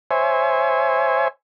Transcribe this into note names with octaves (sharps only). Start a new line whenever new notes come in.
C5 C#5 E5 G#5